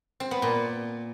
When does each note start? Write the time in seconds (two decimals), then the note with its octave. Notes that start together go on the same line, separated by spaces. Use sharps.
0.20 C4
0.31 B3
0.42 A#2